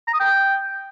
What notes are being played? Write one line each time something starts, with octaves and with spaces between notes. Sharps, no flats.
A#5
D#6
G5